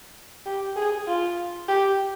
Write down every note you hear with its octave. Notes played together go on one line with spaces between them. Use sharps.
G4
G#4
F4
G4